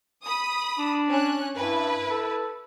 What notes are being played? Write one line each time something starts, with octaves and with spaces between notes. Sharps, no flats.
B5 D#6
D4
C#4 F#6
G2 E4 B4
A4